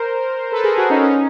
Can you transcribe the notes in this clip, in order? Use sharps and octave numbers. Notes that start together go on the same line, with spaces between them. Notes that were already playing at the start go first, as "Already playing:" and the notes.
Already playing: A#4 C5
A4 B4
G#4 A#4
F#4 G#4
C#4 D#4
C#4 D#4